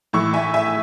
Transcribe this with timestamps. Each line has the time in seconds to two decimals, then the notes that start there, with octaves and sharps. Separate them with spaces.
0.13 A2 E3 C#6 E6
0.33 E5 G#5
0.54 E5 G#5